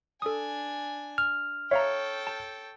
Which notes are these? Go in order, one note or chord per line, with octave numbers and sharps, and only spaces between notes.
D4 A4 G#5 D#6
F6
A4 C#5 E5 F5 G5 A#5
A5